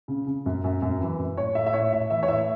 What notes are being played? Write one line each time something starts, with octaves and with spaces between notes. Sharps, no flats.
C#3
C#3
F#2
F#2
F#2
E3
F#2
A2 C#5
A2 E5
E5
A2 C#5
A2 E5
E3 E5
C#5
A2 E5